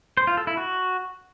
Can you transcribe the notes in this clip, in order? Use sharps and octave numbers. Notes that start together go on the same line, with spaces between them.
C5
F4
A4
E4
F#4